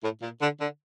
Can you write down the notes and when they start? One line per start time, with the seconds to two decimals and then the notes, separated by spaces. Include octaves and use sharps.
0.03 A2
0.22 A#2
0.42 D3
0.61 D3